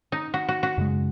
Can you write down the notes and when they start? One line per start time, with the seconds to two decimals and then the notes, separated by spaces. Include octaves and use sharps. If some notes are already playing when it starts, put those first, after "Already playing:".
0.12 D#4
0.34 F#4
0.49 F#4
0.63 F#4
0.78 F#2 C#3 G#3